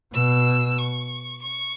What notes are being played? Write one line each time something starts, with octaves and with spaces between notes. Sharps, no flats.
B2 E6
C#6
C#6